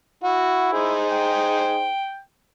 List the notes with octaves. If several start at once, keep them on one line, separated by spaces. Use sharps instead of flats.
E4 F#4
D#4 G#4 C5
G5